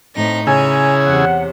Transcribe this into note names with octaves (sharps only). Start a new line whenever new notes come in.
A2 C4 D#4 A#6
C#3 E4 G#4 C#5 G#5 A#5
E2 C3 F#5